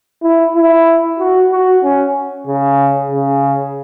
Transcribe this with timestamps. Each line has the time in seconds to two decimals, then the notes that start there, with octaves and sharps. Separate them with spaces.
0.23 E4
0.56 E4
1.19 F#4
1.51 F#4
1.83 C#4
2.47 C#3
3.11 C#3